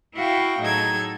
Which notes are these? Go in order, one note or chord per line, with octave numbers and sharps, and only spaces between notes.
E4 F#4 E5 F5 G5
A2 F#3 D#4 G#4 A4 G#6